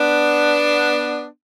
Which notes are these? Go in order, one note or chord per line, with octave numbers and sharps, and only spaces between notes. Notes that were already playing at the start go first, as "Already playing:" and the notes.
Already playing: B3 D4